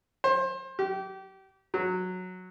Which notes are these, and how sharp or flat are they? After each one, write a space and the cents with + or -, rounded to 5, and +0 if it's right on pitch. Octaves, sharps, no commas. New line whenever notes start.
C5 +25
G4 -30
F#3 -10